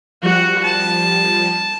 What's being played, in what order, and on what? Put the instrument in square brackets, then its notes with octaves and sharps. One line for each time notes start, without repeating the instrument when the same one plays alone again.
[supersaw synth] F3 G3 [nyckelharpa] F#4 F#5
[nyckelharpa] A5